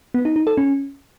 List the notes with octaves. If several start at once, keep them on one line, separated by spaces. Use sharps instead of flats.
B3
D#4
D#4
A4
C#4